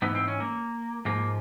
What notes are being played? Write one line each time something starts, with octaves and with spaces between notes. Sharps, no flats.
G#2 E3 B3
C4
C#4
A#3
G#2 F3 A#3